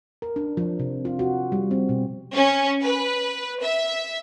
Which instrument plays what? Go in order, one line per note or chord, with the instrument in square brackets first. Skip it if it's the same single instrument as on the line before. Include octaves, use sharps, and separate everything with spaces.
[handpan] A#4
D4
F3
C3
F4
F#4
G3
C4
B2
[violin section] C#4
B4
E5